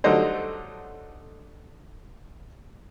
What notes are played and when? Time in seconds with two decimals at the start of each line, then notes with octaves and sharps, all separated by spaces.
0.04 D3 F#3 G3 A3 D#4 C5